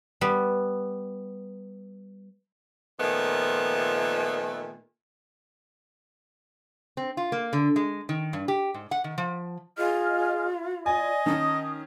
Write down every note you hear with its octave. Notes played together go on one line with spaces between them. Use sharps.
G3 B3
A#2 D#3 F3 A3 B3
C4
F4
A#3
D3
G#3
D#3
G2
G4
G#2
F#5
D#3
F3
F4 G#4 D#5 F6
D5 D#5 G#5
D#3 C#4 A5 D#6